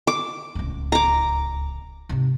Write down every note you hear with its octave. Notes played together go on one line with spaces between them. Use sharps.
D6
D1 C#2
A#5 D6
G#2 C3